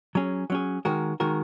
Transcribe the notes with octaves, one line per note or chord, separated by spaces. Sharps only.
F#3 C#4 G#4
F#3 C#4 G#4
D#3 G#3 F#4 A#4
D#3 G#3 F#4 A#4